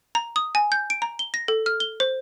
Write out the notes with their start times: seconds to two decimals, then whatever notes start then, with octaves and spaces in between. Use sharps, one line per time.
0.15 A#5
0.36 D#6
0.55 G#5
0.72 G6
0.90 D7
1.02 A#5
1.19 G7
1.34 A#6
1.48 A4
1.66 F6
1.80 G7
2.00 C5